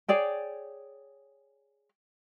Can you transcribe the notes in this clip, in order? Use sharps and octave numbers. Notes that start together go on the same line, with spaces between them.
G#4 C#5 D5 G5